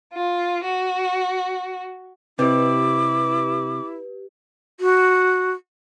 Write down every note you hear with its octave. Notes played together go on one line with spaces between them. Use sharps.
F4
F#4
C3 E4 G4 B4 D6
F#4